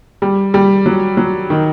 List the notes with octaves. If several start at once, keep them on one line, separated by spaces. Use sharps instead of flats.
G3
G3
F#3
F#3
D#3